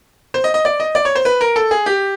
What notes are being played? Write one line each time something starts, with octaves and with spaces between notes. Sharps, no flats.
C5
D#5
D#5
D5
D#5
D5
C#5
C5
B4
A#4
A4
G#4
G4